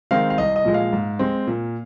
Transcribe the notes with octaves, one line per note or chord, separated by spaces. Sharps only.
D#3 G#3 C4 F5
F5
C2 D#5
D#5
A#2 F3 G#3
F5
G#2
G#3 C4
A#2